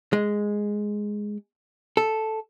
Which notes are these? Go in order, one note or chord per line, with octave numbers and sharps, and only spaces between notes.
G#3
A4